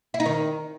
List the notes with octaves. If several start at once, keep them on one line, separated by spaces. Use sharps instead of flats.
E4
D#4
D#3